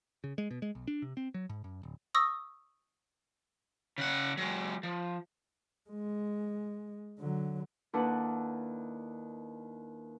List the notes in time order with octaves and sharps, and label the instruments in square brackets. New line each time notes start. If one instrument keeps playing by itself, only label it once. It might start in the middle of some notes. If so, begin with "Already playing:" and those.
[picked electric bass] C#3
G#3
B2
G#3
B1
D4
C3
C4
F#3
G#2
F#2
D1
[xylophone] C#6 D#6 E6 A#6
[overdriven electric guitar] C#3 F#5
F#3 G#3
F3
[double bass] G#3
D3 F#3
[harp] D#2 D4 E4 A4 B4 F#5